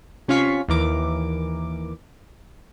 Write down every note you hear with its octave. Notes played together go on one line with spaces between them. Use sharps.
C3 C#4 F4 F5 C#6 B6
D#2 E3 A#4 D6